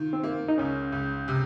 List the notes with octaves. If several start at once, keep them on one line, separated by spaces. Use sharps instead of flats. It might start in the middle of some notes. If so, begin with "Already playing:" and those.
Already playing: D#3 F4
C4
A#3
D#4
C#2 C#4
C#2
C3